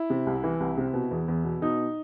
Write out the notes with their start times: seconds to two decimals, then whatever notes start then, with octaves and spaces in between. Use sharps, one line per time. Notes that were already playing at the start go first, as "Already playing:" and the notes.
Already playing: E4
0.10 C3
0.26 C2
0.44 E3
0.60 C2
0.78 C3
0.94 B2
1.11 E2
1.28 E2
1.44 B2
1.62 B2 D#4